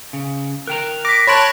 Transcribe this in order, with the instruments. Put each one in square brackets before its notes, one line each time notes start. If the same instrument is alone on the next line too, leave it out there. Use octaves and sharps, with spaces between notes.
[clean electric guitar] C#3
[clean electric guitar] A#4 G5 A#5 [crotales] F#6
[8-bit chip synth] D6 [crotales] A#6 B6
[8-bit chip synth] C#5 A5 F#6 [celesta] B5 C6 D7